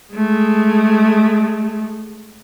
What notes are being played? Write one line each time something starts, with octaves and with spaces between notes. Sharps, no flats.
G#3 A3